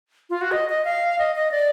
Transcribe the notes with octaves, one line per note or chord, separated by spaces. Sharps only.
F4
F#4
D#5
D#5
F5
D#5
D#5
D5